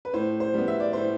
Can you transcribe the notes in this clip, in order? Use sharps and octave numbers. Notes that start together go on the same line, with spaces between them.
B4
A2 C5
C5
G3 B3
E5
D5
A2 C5